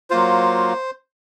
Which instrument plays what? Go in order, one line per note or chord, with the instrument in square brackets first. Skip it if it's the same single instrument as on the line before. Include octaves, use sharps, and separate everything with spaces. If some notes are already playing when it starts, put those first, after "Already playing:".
[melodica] F#3 A#3 F4 C5